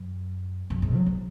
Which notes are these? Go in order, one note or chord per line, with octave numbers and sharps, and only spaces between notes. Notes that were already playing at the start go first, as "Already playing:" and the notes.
Already playing: F#2
F#2
G#2
F#3
F#3